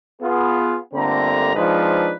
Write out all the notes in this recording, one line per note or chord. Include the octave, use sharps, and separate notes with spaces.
B3 F4 G#4
G1 D3 A3 A#3 C4 A#5
F3 G#3 C4 D4 D#4 B4